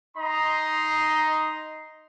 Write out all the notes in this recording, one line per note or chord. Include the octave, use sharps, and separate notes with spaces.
D#4 D#5 A#5 C6